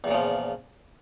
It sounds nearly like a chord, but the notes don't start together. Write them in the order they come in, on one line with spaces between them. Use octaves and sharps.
E2 A#2 C#3 F3